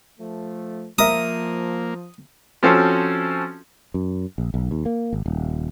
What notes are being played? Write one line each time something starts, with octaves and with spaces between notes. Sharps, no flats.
F3 A3
F3 A#3 A#4 E5 D#6
F3 C4 C#4 F#4 A4 C5
F#2
A#1
B1
D#2
A#3
G#1
D#1